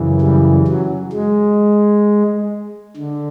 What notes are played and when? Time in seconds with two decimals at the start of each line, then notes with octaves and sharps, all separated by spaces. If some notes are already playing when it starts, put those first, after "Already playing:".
Already playing: F#2 C#3 E3
0.21 G3
0.68 F#3
1.13 G#3
2.97 D3